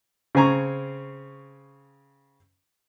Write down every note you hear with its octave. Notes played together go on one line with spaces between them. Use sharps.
C#3 C4 G#5 A#5 C#6